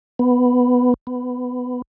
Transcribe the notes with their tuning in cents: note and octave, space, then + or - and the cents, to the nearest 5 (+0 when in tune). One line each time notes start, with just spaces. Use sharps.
B3 +5
B3 +15